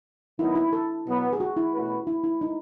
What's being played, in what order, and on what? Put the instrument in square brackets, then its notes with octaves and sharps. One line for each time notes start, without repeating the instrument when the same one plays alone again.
[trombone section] D#3 F#3 B3 D#4 [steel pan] E4
[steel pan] E4
A4
[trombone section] B2 F#3 B3
[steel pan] G#4
F#4
E4
[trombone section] B2 A3 C#4 F#4 B4
[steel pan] E4
E4
D#4